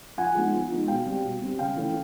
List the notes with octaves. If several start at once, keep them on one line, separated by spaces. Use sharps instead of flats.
F3 F#5 G#5
G#3 B3 D#4
F3
G#3 B3 D#4
B2 F5 G5
G3 C4
B2
G3 C4
C#3 F5 G5
E3 A3 C#4